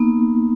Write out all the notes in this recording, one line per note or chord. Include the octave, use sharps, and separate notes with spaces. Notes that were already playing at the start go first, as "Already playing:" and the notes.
Already playing: A#3 B3 D#4